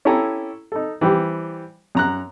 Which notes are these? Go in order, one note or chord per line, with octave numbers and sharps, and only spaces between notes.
C#4 E4 G4 A4 G#5 A#5
D#4 A4
E3 G3 C4 G4
F#2 A#5 F#6